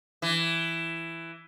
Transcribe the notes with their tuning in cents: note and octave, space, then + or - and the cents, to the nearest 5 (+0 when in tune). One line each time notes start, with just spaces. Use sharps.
E3 +10